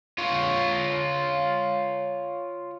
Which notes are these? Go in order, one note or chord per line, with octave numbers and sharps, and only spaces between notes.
F4 C#5